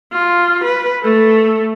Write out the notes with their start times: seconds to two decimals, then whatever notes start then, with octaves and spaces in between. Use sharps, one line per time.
0.12 F4
0.64 B4
1.03 A3 A4